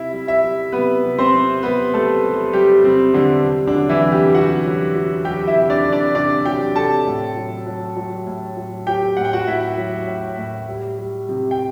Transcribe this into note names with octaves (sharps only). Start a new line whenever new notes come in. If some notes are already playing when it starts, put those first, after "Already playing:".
Already playing: C3 E4 E5
G3
E4 E5
G3
C3 B3 B4
C3
C4 C5
C3
C3 B3 B4
G3 A3 A4
G3
G3 G4
C3 C4
D3 G3 D4
C3
D3 D4
F#3
E3 E4
C3
G3 G4
C3 F#4 F#5
F#3
F#3
F#3 G4 G5
E4 E5
C3
D4 D5
C3
D4 D5
C3 D4 D5
F#3 G4 G5
C3 A4 A5
A2
F#3
F#3
F#3
A2
F#3
F#3 G4 G5
A2 F#5
G5
F#4 F#5
A2 E4 E5
F#3
A2
A2
G3
G3
C3
G5